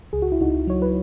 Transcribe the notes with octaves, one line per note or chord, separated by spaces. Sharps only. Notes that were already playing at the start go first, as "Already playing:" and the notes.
C#2 G#4
F#4
E4
C#2 D#4 F#4
F#3 C#5
B4